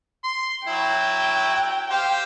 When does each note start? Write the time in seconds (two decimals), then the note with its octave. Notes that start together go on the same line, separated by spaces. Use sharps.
0.24 C6
0.68 F#3 E4 G5
1.91 G4 C5 F5